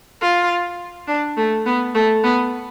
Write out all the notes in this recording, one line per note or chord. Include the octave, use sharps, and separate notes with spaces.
F4
D4
A3
B3
A3
B3